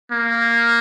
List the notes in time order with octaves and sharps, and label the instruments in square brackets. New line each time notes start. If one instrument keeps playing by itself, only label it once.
[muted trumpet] A#3